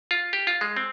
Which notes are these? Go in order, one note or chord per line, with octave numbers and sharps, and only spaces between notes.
F4
G4
F4
G#3
C4